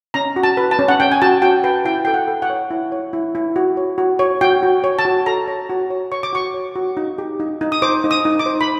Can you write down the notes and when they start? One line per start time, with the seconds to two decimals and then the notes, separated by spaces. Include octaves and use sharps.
0.14 C#4 A#5
0.36 F#4
0.43 A5
0.57 B4
0.71 A5
0.79 C#4
0.88 F#5
1.00 C#4 G5
1.12 G#5
1.22 F#4 A5
1.42 F#4 G5
1.64 B4 G5
1.85 E4 G5
2.05 A4 G5
2.14 F#5
2.27 A4
2.42 F#5
2.50 C#5
2.71 E4
2.92 C#5
3.13 E4
3.35 E4
3.56 F#4
3.77 C#5
3.98 F#4
4.19 C#5
4.41 F#4 G5
4.63 F#4
4.84 C#5
4.99 A5
5.05 F#4
5.26 A4 A#5
5.48 C#5
5.70 F#4
5.90 C#5
6.12 C#5 C#6
6.23 D6
6.33 F#4 C#6
6.54 C#5
6.75 F#4
6.97 D#4
7.18 G4
7.40 D#4
7.61 D#4
7.72 D#6
7.82 C5 D6
8.04 D#4
8.11 D#6
8.25 D#4
8.39 D6
8.46 C5
8.61 B5